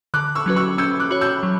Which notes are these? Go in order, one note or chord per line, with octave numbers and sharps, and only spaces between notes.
D3 D6 F#6
C#6 E6
F#3 C#4 F#4 B4
C#6 E6
C#4 E6 G6
D6 F#6
F#4 C#5
E6 G6
F#3